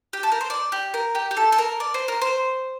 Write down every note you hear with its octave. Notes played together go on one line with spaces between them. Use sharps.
G4
A4
A#4
C5
D5
G4
A#4
G4
G4
A4
A4
A#4
D5
C5
A#4
C5